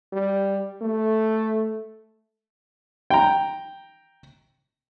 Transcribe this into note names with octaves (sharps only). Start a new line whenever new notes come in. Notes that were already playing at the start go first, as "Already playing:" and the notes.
G3
A3
G5 A#5